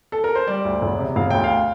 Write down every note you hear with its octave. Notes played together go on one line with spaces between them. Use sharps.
A4
A#4
C5
G3 D5
D2
E1
C3
E1 F5
D2 G5
F5